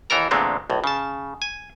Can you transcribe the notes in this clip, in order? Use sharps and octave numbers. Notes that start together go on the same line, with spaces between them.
D#2 E3 A4 A#4 A#5
E2 A#2 D3 G#3 A3 C4
B1 A2
C#3 A5
G#5